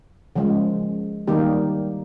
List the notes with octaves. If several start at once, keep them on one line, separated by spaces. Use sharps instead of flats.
C#3 F3 G#3
D#3 G3 A#3 D#4 G4